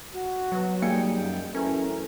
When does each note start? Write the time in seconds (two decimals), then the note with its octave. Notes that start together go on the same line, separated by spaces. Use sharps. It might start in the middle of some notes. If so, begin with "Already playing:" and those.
0.14 F#4
0.52 B2 F#3
0.82 G3 G#3 A#3 D#4 G5 G#5 C#7
1.16 F#2 G5
1.55 F#2 E3 A3 C#4 A#4